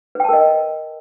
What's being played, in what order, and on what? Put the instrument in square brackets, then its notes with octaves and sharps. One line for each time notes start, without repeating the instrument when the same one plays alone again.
[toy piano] B4
G5
A5
A#4
D#5